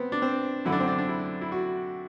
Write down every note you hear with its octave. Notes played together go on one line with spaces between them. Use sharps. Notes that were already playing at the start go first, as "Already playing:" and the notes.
Already playing: B3 C4
D4
C4
F#2 D3 E4
D4
C4
D4
D4
E4
E4
F#4